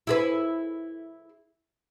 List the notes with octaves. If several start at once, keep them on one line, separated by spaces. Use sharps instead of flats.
E4 G#4 B4